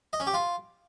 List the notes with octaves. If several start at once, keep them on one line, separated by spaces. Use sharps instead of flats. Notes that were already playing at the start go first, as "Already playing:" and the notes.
D#5
C#4
G4
F4